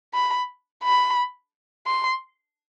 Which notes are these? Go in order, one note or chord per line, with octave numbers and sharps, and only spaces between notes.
B5
B5
C6